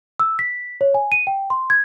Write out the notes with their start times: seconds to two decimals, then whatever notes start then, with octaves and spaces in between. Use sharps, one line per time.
0.20 E6
0.39 B6
0.81 C#5
0.94 G#5
1.12 D#7
1.27 G5
1.50 C6
1.70 G#6